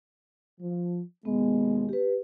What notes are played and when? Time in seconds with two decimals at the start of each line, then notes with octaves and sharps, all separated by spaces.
0.60 F3
1.25 D#2 B2 G#3 B3
1.89 G4 B4